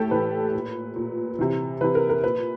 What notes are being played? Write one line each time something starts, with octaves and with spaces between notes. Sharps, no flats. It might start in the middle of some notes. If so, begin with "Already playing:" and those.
Already playing: A2 G4 A4
A2 E3 B4
A#2
A#2
C3 E3
C3 E3 B4
A#4
A#4
A#2 B4